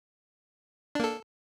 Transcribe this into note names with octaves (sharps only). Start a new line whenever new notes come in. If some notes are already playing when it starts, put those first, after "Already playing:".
A#3 D4 A4